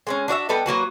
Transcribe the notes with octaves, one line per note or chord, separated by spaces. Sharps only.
G#3 B3 C#4
D4 F#4 D5 E5
G3 B3 A4 D#5
F#3 A#3 F#4 B4